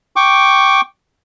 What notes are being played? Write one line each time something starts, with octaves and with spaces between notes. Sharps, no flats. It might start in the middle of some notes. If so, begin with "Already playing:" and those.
G5 C#6 D6